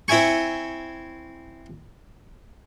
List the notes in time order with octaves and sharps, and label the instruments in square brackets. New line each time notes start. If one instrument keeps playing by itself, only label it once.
[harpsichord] C4 E4 E5 G#5 C#6